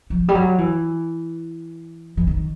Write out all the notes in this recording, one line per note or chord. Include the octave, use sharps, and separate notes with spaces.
F3
G3
F#3
E3
E3
D#3